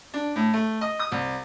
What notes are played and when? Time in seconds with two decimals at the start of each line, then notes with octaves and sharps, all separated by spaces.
0.14 D4
0.36 A2
0.54 A3
0.81 D#5
0.99 D#6
1.12 C2